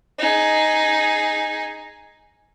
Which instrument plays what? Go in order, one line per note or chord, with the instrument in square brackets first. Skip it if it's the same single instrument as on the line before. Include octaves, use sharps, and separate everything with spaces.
[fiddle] D#4 G#4